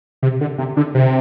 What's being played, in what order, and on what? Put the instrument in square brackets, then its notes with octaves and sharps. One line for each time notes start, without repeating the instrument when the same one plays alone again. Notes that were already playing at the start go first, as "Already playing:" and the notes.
[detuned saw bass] C3
D3
C3
D3
C3